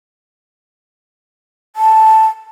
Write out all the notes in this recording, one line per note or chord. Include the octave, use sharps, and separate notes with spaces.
A5